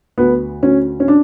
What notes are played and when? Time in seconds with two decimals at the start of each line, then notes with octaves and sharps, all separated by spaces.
0.18 D2 B3
0.63 D2 C#4
1.00 C#4
1.08 D4